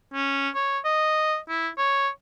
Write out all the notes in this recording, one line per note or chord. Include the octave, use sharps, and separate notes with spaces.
C#4
C#5
D#5
E4
C#5